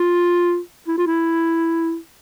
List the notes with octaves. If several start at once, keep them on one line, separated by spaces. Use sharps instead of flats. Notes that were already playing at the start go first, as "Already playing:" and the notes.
Already playing: F4
E4
F4
E4